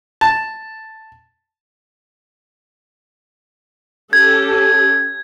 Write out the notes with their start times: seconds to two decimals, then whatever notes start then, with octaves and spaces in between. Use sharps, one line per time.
0.21 A5
4.13 C#4 G4 A4 G#6